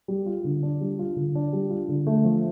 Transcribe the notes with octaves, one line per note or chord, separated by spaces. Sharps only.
G3
F4
D3
D4
G3
F4
D3
D4
G3
F4
D3
A3
F3